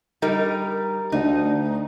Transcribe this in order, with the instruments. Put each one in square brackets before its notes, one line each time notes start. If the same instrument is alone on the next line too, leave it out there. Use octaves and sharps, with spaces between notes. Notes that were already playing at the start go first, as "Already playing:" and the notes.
[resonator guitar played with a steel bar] G3 D#4 A#4
[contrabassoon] D2 [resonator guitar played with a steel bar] D#4